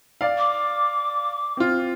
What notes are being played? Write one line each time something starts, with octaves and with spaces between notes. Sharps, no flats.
D5 F5
D6
C4 F4